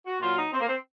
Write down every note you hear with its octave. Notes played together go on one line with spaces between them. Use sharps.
F#4
A#2 F#3 F4
D#4
C4
A#3
C4